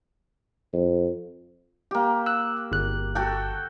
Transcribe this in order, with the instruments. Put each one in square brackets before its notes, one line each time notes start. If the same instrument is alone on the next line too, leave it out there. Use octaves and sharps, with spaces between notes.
[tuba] F2
[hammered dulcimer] A#3 G4
[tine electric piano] E6 F#6
G1 F#6
[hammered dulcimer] F#4 A4 G5